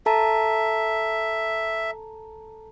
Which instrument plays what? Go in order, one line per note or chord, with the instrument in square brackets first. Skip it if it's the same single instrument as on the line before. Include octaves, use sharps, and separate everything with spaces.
[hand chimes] A4 A5 A#5 [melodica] E5